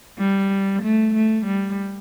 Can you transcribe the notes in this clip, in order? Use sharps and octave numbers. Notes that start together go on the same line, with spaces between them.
G3
A3
A3
G3